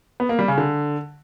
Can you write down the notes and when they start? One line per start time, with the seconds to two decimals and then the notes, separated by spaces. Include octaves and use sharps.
0.20 B3
0.29 A#3
0.39 G3
0.48 C#3
0.58 D3